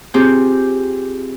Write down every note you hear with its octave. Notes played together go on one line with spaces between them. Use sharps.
C4 F4 G4 G#4